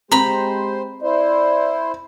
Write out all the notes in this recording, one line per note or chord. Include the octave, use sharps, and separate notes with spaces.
G#3 C4 G4 C5 A#5 B5
E4 C5 D5